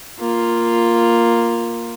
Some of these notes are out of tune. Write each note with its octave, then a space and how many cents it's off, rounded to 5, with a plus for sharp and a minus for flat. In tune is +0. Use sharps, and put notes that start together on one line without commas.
A#3 +0 F4 +0